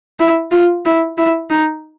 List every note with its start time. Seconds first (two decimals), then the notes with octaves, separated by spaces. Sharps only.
0.19 E4
0.52 F4
0.85 E4
1.18 E4
1.50 D#4